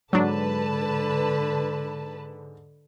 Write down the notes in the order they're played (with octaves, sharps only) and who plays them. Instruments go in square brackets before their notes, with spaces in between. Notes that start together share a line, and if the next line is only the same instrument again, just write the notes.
[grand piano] G#2 [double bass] D3 [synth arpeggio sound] F#3 D4 [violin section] B4 A5